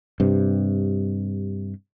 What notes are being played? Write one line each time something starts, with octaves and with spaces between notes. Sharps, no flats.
G2 C3